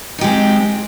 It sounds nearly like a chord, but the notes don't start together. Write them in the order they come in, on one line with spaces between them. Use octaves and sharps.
D#4 G4 G#3 C4